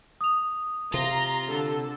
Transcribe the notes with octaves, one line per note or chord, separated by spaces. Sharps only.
D#6 F7
C3 F4 A#5
D3 A4